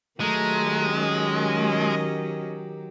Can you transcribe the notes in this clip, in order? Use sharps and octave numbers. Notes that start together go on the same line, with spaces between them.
D#3 F#3 G#3 A3 G4 A#5
C#4 D#5